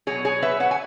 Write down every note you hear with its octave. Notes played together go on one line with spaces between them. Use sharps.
B2 F#3 G#4 C#5
G#4 C#5
B4 E5
C#5 F#5
G#5